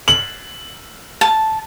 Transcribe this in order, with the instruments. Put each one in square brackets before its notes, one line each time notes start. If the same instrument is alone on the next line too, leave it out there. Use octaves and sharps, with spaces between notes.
[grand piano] F#7
[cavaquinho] A5